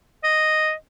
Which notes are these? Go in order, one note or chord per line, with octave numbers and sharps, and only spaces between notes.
D#5